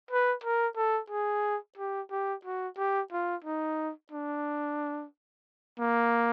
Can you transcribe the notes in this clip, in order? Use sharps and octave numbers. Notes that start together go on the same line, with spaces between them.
B4
A#4
A4
G#4
G4
G4
F#4
G4
F4
D#4
D4
A#3